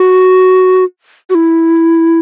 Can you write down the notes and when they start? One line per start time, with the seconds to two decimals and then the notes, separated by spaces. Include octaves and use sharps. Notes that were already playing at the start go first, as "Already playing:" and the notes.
Already playing: F#4
1.30 F#4
1.35 E4